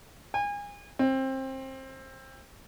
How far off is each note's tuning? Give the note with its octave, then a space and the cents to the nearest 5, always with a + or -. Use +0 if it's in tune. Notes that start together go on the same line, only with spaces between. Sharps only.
G#5 -30
C4 +25